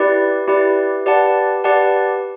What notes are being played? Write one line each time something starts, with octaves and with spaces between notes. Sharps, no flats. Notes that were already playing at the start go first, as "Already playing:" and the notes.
Already playing: E4 G4 B4 D5
E4 G4 B4 D5
G4 B4 D5 F#5 A5
G4 B4 D5 F#5 A5